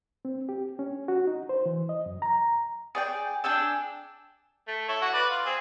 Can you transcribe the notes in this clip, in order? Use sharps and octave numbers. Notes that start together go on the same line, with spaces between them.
C4
G4
C#4
F#4
D#4
C5
E3
D#5
F#2
A#5
G#4 D5 G5
D4 G#4 G5 E6
A3
E4 A4 C#5
F#4
B4 D5
F4
C4 G#4